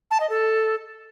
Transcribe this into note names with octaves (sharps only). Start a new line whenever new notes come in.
A5
D#5
A4